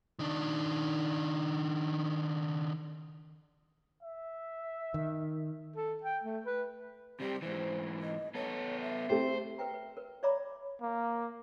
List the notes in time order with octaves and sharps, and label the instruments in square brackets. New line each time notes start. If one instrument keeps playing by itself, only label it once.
[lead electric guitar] D#3 D4
[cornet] E5
[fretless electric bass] D#3
[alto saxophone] A4
G5
A3
B4
[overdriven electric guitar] C3 G3 [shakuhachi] G4
[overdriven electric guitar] G#2 E3 [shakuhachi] C5
[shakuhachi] D#5
[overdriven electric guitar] B3 A4 [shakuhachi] C#5
[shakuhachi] E5
[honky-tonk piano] A3 C4 G4 [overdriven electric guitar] C5
[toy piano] A#4 B4 E5 G5 A#5
B4
A#4 B4
C#5 D5 E5 A#5 B5 D6
[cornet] A#3